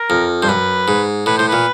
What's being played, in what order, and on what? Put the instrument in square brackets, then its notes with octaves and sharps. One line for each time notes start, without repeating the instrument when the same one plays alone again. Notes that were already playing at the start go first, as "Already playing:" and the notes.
Already playing: [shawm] A#4
[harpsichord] F2
[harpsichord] G2 [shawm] C5
[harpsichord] F#2 [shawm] B4
[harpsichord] G#2
[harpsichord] A2 [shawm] B4
[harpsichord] A2 [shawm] C5
[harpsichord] A#2 [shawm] B4